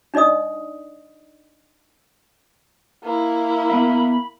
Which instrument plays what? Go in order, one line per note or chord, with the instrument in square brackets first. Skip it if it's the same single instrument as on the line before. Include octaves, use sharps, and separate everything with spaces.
[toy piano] D4 D#4 D5 D#5 D#6
[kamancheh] A#3 E4
[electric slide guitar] B3 E5 [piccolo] B5